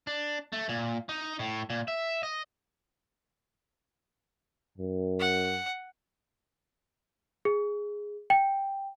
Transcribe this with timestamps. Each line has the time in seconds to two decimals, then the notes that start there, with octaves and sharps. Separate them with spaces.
0.07 D4
0.53 A3
0.69 A#2
1.09 D#4
1.39 A2
1.70 A#2
1.88 E5
2.23 D#5
4.78 F#2
5.20 F#5
7.45 G#4
8.30 G5